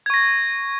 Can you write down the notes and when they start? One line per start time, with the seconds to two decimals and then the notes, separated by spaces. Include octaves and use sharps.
0.06 G#6
0.10 C#6
0.14 A#6